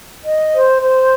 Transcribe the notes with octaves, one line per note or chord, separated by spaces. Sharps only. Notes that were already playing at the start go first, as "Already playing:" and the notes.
D#5
C5
C5